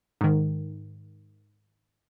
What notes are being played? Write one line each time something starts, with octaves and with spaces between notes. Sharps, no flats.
G#2 D#3